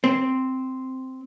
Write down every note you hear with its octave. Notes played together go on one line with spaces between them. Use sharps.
C4